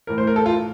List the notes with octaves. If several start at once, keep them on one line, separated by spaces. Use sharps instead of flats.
A2 E3 A#4
C5
A#4
A4
F4